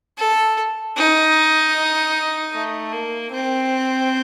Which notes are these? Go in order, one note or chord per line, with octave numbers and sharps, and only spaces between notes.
A4
D#4
A3
A#3
C4